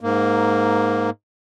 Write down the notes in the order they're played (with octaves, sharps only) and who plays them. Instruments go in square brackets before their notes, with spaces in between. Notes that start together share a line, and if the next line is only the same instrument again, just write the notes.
[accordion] G#2 A#3